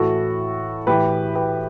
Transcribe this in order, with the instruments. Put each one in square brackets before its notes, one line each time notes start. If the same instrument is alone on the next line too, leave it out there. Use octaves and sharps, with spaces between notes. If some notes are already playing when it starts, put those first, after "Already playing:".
Already playing: [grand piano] A2 E3 F#4 A4
A2 E3 G4 B4
G4 B4